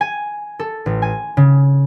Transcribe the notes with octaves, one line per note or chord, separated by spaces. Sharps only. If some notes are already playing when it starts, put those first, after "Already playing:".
G#5
A4
A1
G#5
C#3